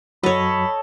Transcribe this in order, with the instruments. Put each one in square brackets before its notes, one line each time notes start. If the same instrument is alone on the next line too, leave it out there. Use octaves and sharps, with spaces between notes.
[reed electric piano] F#2 F#3 [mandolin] A4 [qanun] C#5 D#5 [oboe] B5